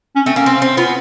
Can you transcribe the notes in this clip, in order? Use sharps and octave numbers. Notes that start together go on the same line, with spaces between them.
C#4
A3 C4
A#3 C#4
C4
C4
B3 F4